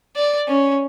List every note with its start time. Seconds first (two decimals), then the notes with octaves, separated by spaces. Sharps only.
0.16 D5
0.48 C#4